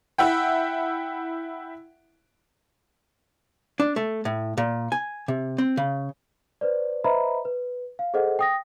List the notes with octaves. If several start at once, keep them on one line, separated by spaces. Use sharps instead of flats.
E4 E5 F#5 G5
D4
A3
A2
A#2
G#5
C3
C4
C#3
B4 C5 D5
B4 C5 D#5 E5 A#5 B5
B4
F5
G#4 A4 C5 D#5 F#5
G5 D#6 A#6